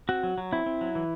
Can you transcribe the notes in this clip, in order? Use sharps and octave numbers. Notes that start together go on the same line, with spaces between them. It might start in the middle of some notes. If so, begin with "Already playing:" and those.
C4 F#4
F#3
F#3
C4 E4
C4
F#3
E3